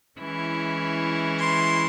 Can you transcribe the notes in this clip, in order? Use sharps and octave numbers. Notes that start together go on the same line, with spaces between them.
E3 G#3 C#4 E4
C6